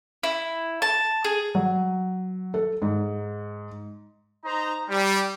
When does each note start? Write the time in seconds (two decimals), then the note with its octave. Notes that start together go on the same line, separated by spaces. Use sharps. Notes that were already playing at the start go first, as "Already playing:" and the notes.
0.23 E4
0.82 A5
1.24 G#4
1.55 F#3
2.54 A4
2.82 G#2
4.45 D#4 C5 A#5
4.89 G3